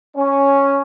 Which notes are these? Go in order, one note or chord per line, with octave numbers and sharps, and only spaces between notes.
C#4